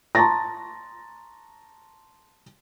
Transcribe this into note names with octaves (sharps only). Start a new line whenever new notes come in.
A5 A#5 C6 C#6 A6 A#6